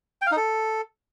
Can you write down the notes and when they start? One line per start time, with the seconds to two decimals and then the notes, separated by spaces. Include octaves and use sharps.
0.22 G5
0.27 F5
0.32 D#4
0.37 A4